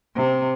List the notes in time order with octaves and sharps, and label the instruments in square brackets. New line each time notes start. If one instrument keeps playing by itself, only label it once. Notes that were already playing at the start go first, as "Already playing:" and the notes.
[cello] C3